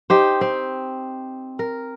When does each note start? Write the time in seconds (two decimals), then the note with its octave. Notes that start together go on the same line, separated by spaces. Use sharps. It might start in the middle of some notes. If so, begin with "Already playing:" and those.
0.10 D#4 G4 C5
0.41 C4
1.59 A#4